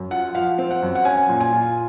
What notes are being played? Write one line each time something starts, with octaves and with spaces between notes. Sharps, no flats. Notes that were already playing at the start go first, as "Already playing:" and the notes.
Already playing: F#2
F4 F#5
F3 F5
C4
F#5
F#2
F#5
C#4 G#5
A#2
G#5
F4